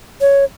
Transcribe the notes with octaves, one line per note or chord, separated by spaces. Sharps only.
C#5